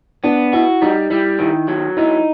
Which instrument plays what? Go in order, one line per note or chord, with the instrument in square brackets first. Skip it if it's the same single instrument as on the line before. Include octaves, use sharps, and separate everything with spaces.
[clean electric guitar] B3 [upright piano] D4
[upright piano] E4 [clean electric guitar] F#4
[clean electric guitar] G3 [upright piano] D#4
[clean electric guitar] G3 [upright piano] E4
[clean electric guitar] D#3 [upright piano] E4
[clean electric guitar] F#3
[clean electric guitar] D#4 [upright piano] E4